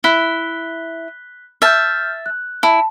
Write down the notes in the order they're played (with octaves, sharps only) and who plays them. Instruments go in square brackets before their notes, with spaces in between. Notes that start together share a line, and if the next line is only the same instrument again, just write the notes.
[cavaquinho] E4 [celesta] F#6 B6 G7
[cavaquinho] E5 A5 [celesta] F6 G6
[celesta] F#6
[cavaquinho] E4 [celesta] A5